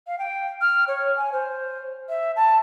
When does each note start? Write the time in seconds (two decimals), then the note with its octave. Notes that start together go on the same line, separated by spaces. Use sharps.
0.07 F5
0.19 G5
0.61 F6
0.88 C#5
1.17 G#5
1.33 C5
2.09 E5
2.36 A5